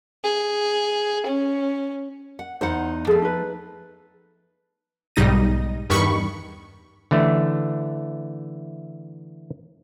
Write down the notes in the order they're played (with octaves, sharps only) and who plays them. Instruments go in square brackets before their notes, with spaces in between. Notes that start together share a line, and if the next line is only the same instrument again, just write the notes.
[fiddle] G#4
C#4
[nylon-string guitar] F#5
[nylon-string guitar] E2 D#4 F#5 [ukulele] C5
[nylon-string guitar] F3 A3 [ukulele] G#4 A4
[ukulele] D#4 B4
[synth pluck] B1 G#2 G3 D#4 A#6 D#7
E2 G2 D#3 B5 C#6 C#7
[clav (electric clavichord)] D3 E3 A3